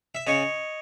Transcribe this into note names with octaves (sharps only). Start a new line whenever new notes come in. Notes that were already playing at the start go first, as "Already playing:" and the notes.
E5
C#3 C#5 D#5